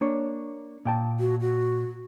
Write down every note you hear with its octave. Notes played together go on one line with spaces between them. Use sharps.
A#3 D4 C#5
A#2 G5 A5
F#4
F#4